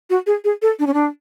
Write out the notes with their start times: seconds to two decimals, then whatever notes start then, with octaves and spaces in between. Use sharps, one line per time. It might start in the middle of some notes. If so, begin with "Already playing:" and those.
0.10 F#4
0.27 G#4
0.44 G#4
0.62 A4
0.79 D4
0.87 C#4
0.94 D4